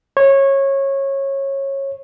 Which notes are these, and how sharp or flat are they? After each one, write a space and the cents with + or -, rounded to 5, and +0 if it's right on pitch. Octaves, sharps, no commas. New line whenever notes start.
C#5 -20